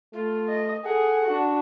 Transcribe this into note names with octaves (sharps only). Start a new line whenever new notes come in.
A3 F4
D#5
G#4 A4 F#5
D4 F#4